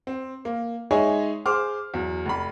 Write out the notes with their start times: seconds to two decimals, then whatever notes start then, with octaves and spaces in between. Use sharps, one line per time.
0.07 C4
0.45 A#3
0.91 G#3 D#4 G#4 C#5 E5 G#5
1.46 G#4 C5 C6 D6 F6
1.94 E2 F#3
2.26 F1 B5